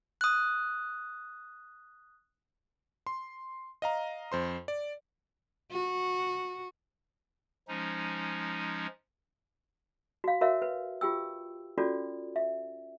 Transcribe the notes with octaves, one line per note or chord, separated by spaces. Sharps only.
D#6 F#6
C6
D#5 F5 A#5
F2 C5 C6
D5
F#4
F3 G#3 C#4 D#4
F#4 F5
F#4 A#4 C#5 E5 F5
B4
F4 G4 G5 E6
C#4 F4 F#4 A4 D5
E5